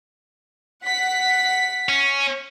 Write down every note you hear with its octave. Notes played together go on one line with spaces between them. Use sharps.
F#5 B6
C#4